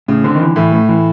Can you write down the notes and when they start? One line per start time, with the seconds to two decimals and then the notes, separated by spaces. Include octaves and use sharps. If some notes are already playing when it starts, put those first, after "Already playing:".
0.08 A2 C#3
0.24 D3 C4
0.35 D#3
0.40 D3 E3
0.56 A2 E3
0.72 A3
0.89 E3